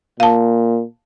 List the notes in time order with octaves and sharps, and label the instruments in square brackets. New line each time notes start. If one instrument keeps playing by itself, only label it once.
[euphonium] A#2 [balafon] F5 A5